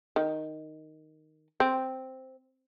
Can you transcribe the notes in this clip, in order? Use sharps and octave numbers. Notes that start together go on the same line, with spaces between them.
D#3
C4